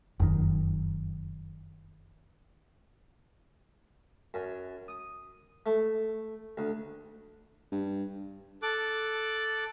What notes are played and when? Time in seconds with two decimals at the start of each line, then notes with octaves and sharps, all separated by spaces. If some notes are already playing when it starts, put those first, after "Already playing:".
0.20 F1 F#2 B2 D#3
4.34 F#2
4.88 D#6
5.66 A3
6.57 D2
7.72 G2
8.62 A4 D6 F#6